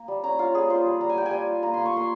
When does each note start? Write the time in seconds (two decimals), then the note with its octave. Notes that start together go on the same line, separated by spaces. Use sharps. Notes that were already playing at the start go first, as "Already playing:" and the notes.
Already playing: A#3
0.08 G3
0.24 C#4 A#5
0.39 F4 F5
0.54 G3 G#4
0.70 F4 C5
0.86 G3
1.01 G3 A#5
1.09 G#5
1.16 G3 G5
1.26 G#5
1.31 G3
1.47 F4
1.62 A#3 A#5
1.74 A#3 C6
1.85 C#6
1.93 A#3 C6